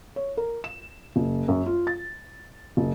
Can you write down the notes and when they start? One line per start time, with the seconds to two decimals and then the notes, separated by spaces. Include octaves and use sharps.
0.16 C#5
0.37 A#4
0.64 E7
1.16 F#1
1.48 F#2
1.66 F4
1.87 A6
2.77 F#1